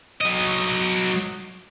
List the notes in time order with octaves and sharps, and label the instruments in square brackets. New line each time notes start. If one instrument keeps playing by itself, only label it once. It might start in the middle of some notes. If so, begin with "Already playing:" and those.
[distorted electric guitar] F#3 D#5